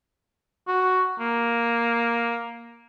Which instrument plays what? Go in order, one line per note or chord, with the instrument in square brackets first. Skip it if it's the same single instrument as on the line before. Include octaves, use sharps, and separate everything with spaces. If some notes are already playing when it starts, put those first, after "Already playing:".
[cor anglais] F#4
A#3